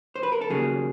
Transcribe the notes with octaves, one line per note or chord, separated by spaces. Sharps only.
C5
B4
A#4
A4
D#2 C#3 F#3 A#3 G#4